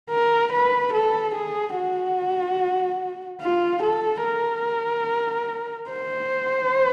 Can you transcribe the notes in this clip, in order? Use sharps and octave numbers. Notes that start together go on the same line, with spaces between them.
A#4
B4
A4
G#4
F#4
F4
A4
A#4
C5